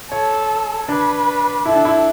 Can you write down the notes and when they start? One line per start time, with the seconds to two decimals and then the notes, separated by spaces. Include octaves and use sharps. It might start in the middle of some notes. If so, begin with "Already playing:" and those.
0.11 A4 C#5
0.89 D4 B4
1.66 E4 A4
1.75 D4
1.85 E4